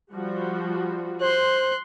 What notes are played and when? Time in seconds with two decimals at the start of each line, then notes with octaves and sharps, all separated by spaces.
0.13 F3 G3 F#4
1.21 C5 C6 F#6